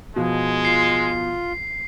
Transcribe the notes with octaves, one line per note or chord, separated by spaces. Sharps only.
B2 F3 G#3
F4 C7